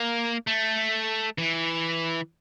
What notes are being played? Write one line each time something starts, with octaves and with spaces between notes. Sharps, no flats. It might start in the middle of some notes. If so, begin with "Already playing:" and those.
Already playing: A#3
A3
E3